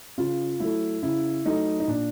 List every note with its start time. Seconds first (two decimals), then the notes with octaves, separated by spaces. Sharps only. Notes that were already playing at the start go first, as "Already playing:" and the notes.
0.18 C#3 F4
0.60 F#3 A3 E4
1.03 C#3 E4
1.46 F#3 A3 D#4
1.80 D#4
1.87 A#2 D4